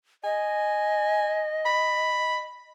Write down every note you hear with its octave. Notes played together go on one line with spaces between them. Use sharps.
D#5 G#5
B5